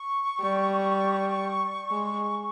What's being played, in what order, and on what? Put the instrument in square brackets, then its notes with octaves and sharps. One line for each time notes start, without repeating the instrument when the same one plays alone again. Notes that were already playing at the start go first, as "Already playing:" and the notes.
Already playing: [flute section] C#6
[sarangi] G3
G#3